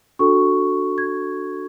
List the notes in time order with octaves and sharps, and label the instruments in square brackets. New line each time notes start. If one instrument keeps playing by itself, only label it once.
[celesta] D4 F#4 A4 C#6
G#6